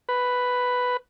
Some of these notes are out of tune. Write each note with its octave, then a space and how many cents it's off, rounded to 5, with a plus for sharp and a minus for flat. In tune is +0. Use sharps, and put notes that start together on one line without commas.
B4 +5